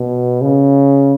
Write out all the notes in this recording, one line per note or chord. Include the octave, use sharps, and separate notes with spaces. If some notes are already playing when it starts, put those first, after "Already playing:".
Already playing: B2
C#3